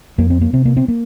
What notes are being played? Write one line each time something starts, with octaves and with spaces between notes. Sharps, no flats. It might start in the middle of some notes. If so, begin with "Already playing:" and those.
F2 A#3
C4
A#3
C3 C4
A#3
C4
A#3